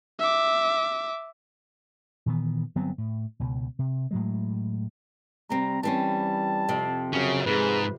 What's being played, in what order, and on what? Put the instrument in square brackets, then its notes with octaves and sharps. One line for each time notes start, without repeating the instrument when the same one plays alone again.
[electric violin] E5 D6
[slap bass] A#2 D#3 E3 B3
G1 F#3 B3 C4
A2
C#2 B2
C3
A2 F#3 G#3
[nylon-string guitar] C3 C4 [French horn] G3 [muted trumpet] A#5
[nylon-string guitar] E3 C4 C#4 [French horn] G3 [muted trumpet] A5
[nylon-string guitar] F2 C3 C4
[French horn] F#2 [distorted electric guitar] C#3 C#4
[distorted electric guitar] G#2 [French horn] G#4 [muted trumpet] B4